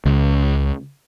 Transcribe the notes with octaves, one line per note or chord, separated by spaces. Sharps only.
C#2